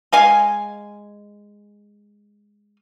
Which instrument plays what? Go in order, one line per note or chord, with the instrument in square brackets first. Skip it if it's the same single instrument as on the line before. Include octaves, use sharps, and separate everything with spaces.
[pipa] G#3 F5 G#5